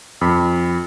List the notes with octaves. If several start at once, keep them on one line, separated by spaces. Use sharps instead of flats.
F2 B5